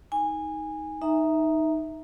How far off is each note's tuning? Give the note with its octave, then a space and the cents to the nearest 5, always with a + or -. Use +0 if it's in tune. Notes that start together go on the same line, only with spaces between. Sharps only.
D#4 +15 G#5 -15
D#4 +0 E5 -10 A#5 +0